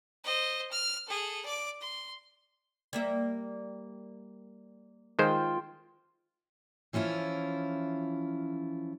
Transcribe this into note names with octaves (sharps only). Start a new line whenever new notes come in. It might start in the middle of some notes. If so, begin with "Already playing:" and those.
C5 D#5
F6
G#4 A4
D5 D6
C6
G3 A#3 E5
D#3 G#3 F4 C5 G5
E3 F3 C#4 E4 F4